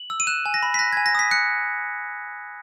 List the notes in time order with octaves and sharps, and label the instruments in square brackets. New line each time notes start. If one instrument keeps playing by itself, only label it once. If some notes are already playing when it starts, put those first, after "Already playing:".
Already playing: [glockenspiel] F#7
E6
D#7
F#6 E7
G#5
A#6
B5
B6
F#6 A#6
G#5 G#6
A#6
D#6 B6
F#6 C#7